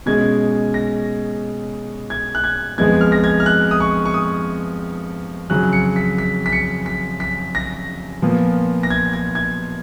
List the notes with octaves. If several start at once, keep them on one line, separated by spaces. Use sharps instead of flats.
B2 G#3 C#4 G#6
A#6
G#6
F#6
G#6
F2 F3 G#3 B3 G#6
F6
A#6
G#6
F6
F#6
D#6
C#6
C#6
D#6
F2 C#3 F#3 C#4 F#6
C#7
B6
B6
B6
C#7
B6
B6
A#6
A#2 F3 B3
A#6
G#6
G#6
G#6